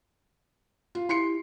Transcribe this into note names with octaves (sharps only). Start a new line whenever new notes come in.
F4
E4 G4 C6 C7 C#7